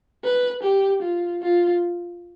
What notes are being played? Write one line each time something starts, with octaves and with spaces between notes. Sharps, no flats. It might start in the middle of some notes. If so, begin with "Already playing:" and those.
B4
G4
F4
F4